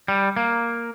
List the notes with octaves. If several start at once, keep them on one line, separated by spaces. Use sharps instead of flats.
G3
A#3